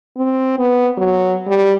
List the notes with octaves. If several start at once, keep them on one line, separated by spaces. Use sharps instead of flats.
C4
B3
F#3
G3